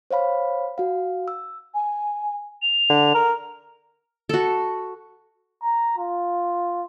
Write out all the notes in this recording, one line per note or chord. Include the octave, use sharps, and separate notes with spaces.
C5 C#5 F5 B5
F#4 F5
E6
G#5
F7
D3
A#4
F#4 A4
A#5
F4